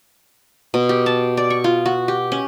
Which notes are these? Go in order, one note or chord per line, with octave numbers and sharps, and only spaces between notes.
B2
G4
A5
D5
C#6
F4
F#4
G4
C#4